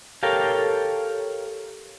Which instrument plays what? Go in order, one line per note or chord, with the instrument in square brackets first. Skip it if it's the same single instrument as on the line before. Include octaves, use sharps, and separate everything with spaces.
[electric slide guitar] G4 A4 A#4 C#5 F5 G5